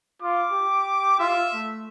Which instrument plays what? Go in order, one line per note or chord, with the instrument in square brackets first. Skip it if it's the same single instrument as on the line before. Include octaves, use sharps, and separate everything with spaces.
[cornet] F4 [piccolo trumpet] D6
[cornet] G4
[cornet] F4 [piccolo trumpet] E5
[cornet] A3